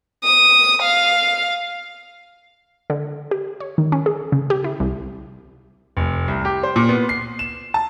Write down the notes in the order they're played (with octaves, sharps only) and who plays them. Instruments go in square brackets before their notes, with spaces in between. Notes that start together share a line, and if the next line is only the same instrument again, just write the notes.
[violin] D#6
F5
[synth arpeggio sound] D3
G4
C#5
D#3
C#4
G#4
C#3
G4
E4
C2
[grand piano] F1
C2
G4
C5
A#2
B3
C7
E7
A5